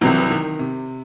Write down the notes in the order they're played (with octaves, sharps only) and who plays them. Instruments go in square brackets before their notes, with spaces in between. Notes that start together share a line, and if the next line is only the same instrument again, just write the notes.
[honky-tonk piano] C2 C3 F#3 [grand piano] E3
[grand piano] E3
D#3
C3